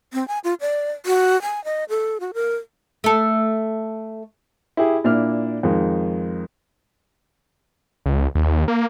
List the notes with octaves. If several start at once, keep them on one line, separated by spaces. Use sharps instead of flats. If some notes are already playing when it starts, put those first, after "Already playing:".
C4
G#5
F4
D5
F#4
G#5
D#5
A4
F#4
A#4
A3 A4
E4 G4 G#4
A#2 D4 E4 F6
F2 D#3 G#3
C#2
D#2
A#3